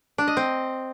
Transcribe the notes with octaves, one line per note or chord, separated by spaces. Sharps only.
D4
D#5
C4